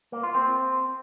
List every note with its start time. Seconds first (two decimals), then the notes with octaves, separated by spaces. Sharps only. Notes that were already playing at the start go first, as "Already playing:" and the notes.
0.12 A#3
0.23 F4
0.35 C4